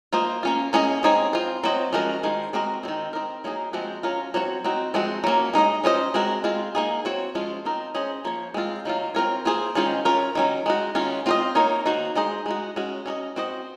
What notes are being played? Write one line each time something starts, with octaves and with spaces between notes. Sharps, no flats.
A#3 F4 C5 D#5
A#3 C#4 F4
A#3 C#4 G#4 C5 D#5
G#3 C4 D#4 G#4 C#5
C4 F4 C5
F#3 C4 F#4 C5 D#5
F3 G#3 C#4 F#4 A#4
D#3 G#3 C5
G#3 C4 F#4 A#4 D#5
D#3 F#3 C4
C4 D#4 A#4
F#3 A#3 D#4 G#4
F3 G#3 C4 F#4
F#3 C#4 F4 A#4
F#3 C4 F#4 C#5
C4 D#4 F#4
F3 G#3 C4 F#4
F#3 A#3 C#4
G#3 D#4 A#4 D#5
C#4 F4 C5 D#5
G#3 C4 F#4 A#4
G#3 C4 F4
A#3 D#4 G#4
C4 F#4 C#5
F3 G#3 C#4 F4
C4 D#4 A#4
C#4 G#4 C5 D#5
F3 A#3 C#5
G#3 C4 F4
D#3 F#3 A#3 F4
C4 F4 A#4 C#5
A#3 F4 G#4 C5
D#3 G#3 C#4 F4 C5
C#4 F4 A#4 C#5
D#3 F#3 C#4
G#3 D#4 F#4
D#3 G#3 C#4 F4
C4 F4 C5 D#5
A#3 D#4 A#4 C#5
D#3 A#3 D#4 F#4 C5
G#3 D#4 G#4 C5 D#5
G#3 D#4 F#4
G#3 C#4 F#4
C#4 F#4 A#4 D#5
C4 F#4 C5 D#5